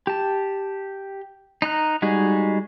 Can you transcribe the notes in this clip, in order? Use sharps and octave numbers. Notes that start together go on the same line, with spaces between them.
G4 A5
D#4 A#5 F#6
G3 G#3 D#4 F#4 G#4